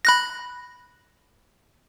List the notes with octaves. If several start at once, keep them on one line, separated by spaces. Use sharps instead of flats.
B5 F#6 A#6